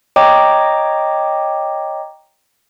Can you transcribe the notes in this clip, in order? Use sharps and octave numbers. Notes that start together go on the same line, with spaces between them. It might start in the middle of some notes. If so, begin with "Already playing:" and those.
C#5 D#5 G5 A#5 D6